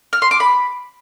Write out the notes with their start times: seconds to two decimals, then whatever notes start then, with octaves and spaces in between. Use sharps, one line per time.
0.13 F6
0.22 C6
0.31 D6
0.40 B5